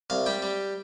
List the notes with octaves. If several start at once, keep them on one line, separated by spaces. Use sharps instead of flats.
C2 F5
G3 G5
G3